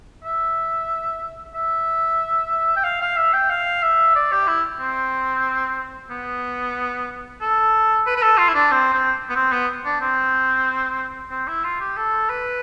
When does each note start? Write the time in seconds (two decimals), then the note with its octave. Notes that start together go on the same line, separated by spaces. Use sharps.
0.24 E5
1.54 E5
2.77 G5
2.84 F5
3.02 F5
3.17 E5
3.33 G5
3.50 F5
3.83 E5
4.16 D5
4.32 G4
4.47 E4
4.80 C4
6.10 B3
7.41 A4
8.06 B4
8.16 B4
8.23 A4
8.38 F4
8.48 E4
8.55 D4
8.72 C4
8.93 C4
9.29 B3
9.36 C4
9.52 B3
9.85 D4
10.01 C4
11.31 C4
11.48 E4
11.64 F4
11.81 G4
11.97 A4
12.29 B4